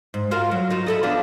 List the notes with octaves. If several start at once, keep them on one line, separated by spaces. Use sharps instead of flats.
G#2
F4 F#4 A#4
F#3
D#4 F4 F#4
E4 A4 D#5
F3 B3 D4